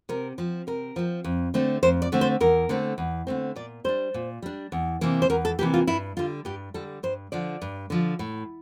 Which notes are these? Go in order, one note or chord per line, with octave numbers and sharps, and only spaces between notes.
C3 A#4
F3 C4
C3 A#4
F3 C4
F2
D3 A3 C4
F2 C5
D5
D3 A3 C4
C5
E2 A#4
D3 A3 C4
E2
D3 A3 C4
A#2 D5
G3 D4 C5
A#2
G3 D4
E2
C3 E3 A#3
C5
E2 A#4
A4
C3 E3 A#3 G4
F4
G2 E4
D3 G3 F4
G2 G4
D3 G3 A4
G2 C5
D3 F3 D5
G2
D3 F3
A2